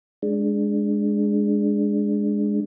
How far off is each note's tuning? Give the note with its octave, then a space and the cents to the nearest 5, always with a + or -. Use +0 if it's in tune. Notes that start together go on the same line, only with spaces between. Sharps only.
G#3 +0 D4 +0